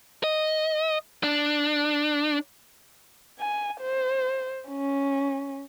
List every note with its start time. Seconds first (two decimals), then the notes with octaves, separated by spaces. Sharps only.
0.24 D#5
1.24 D4
3.39 G#5
3.81 C5
4.69 C#4